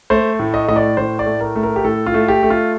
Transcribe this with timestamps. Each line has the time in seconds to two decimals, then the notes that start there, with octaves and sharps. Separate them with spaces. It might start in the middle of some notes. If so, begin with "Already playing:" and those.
0.10 A3 C5
0.39 A2
0.54 D#5
0.68 A2 D#5
0.76 D5
0.97 A2 C5
1.19 D5
1.26 A3
1.41 A#4
1.56 A3
1.63 A#4
1.76 G4
1.84 A2 A4
2.06 F4
2.14 A3
2.28 G4
2.43 A3
2.50 F4